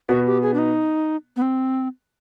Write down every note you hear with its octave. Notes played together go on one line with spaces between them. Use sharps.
B2 B3 F#4
G4
G#4
D4
D#4
B3
C4